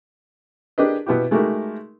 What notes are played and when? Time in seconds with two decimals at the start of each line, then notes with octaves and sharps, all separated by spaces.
0.78 D4 G4 G#4 A#4 B4 D#5
1.06 B2 B3 E4 G4
1.31 G#3 A3 D#4 F#4 G4 A#4